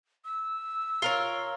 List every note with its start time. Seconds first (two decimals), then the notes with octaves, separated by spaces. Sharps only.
0.25 E6
1.02 F4 A#4 C#5